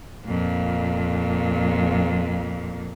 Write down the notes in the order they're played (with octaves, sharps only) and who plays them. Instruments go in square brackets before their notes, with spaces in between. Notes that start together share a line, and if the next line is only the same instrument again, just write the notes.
[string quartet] F2 A#2